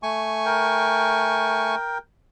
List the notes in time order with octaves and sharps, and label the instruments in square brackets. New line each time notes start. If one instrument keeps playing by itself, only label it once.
[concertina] A3 G#5 C#6
[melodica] A#4 G5